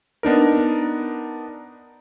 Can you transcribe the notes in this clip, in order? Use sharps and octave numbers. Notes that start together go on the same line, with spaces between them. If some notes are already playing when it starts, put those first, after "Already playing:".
B3 D4 D#4 A#4